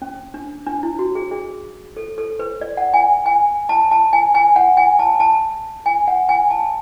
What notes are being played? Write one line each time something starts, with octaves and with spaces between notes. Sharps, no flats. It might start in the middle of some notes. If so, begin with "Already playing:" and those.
C#4
D4
D4
E4
F#4
G#4
G#4
A4
A4
B4
D5
F#5
G#5
G#5
A5
A5
G#5
G#5
F#5
G#5
A5
A5
G#5
F#5
G#5
A5